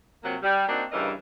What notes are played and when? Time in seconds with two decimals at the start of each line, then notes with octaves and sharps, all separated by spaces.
0.23 C3 F3 F#3 A#3
0.42 G3
0.68 A#3 C4 D4 D#4 F#4
0.92 G2 C#3 E3 A#4 D#5